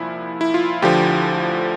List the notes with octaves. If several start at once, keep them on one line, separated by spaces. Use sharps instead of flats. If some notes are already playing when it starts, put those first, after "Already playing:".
Already playing: C2 A#2 F3 E4 F4
E4
F4
D2 D3 F3 G4